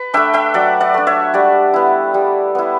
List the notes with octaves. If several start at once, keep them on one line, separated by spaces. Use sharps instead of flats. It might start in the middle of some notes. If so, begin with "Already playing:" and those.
Already playing: B4
A3 D4 E5 G5
E5 G5
F#3 D5 F#5
D5 F#5
A3 D4
C#5 E5
G3 D5 F#5
B3 E4
G3
B3 E4